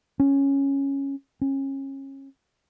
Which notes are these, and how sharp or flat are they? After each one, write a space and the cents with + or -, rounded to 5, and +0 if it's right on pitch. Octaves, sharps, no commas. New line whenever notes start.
C#4 -5
C#4 -30